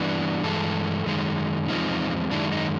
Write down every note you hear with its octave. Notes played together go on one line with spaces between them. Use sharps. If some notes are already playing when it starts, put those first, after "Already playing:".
Already playing: G2 E3 G3 B3 D4
G2 E3 G#3 A4
F#2 D#3 G#3
E2 C3 F3 G#3 C4 D#4 F4
F#2 D#3 G#3 D4 E4
D#4